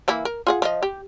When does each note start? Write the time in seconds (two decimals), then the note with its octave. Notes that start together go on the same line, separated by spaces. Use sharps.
0.08 E3 A#3 E4
0.25 A#4
0.47 F4 G#4 F#5
0.62 F3 D#5
0.83 G4